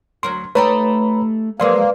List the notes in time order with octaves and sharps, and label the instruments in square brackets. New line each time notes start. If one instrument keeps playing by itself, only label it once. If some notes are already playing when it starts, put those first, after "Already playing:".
[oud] D2 F#3 A#4 [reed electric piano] C6
[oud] A3 D#4 G4 [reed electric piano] B4 C#5 [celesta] A#5 B5
[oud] F3 F#3 G#3 [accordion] A#3 [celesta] B4 D5 [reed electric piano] F5 C6